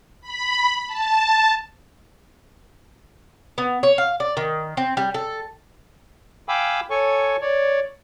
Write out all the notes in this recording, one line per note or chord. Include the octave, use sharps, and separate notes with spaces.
B5
A5
B3
C#5
F5
D5
D#3
C4
G3
A4
F5 G5 G#5 B5 D6 E6
A4 C#5 G#5 C#6
C#5 D5